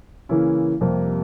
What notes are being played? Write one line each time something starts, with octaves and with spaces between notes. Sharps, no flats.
C#3 E3 A#3 C#4 E4
F2 C3 G3 A#3